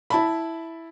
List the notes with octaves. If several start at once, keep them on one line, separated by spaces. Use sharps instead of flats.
E4 A5 B5